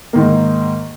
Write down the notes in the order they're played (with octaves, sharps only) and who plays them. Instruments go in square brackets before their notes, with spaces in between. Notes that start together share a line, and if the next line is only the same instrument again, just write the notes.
[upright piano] G#2 D#3 A#3